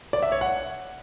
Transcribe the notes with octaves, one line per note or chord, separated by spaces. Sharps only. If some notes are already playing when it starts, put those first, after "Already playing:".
D5
E5
C#5
F#5